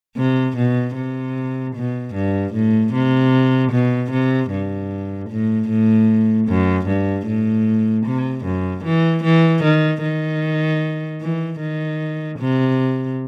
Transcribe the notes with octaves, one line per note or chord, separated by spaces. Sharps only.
C3
B2
C3
B2
G2
A2
C3
B2
C3
G2
A2
A2
F#2
G2
A2
C3
F#2
E3
E3
D#3
D#3
E3
D#3
C3